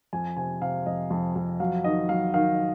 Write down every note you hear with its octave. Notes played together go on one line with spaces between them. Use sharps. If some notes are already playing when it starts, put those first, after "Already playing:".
F2 G#5
C3 G#5
C3 F5
F2 D#5
F2
F2
F#3 F5
D#3 D#5
F#3 F5
D#3 F5